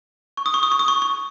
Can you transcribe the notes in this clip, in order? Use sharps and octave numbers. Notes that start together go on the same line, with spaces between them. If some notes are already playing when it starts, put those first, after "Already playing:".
C#6
D#6
C#6
D#6
C#6
D#6
C#6
C#6